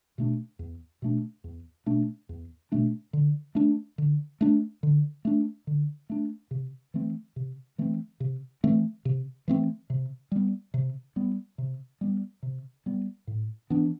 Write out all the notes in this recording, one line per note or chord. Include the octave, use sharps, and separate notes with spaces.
B2 A3 D4
E2
B2 A3 D4
E2
B2 A3 D4
E2
B2 A3 D4
D3
A3 D4
D3
A3 D4
D3
A3 D4
D3
A3 D4
C3
E3 A3 C4
C3
E3 A3 C4
C3
E3 A3 C4
C3
E3 A3 C4
C3
G3 B3
C3
G3 B3
C3
G3 B3
C3
G3 B3
A2
E3 B3 D4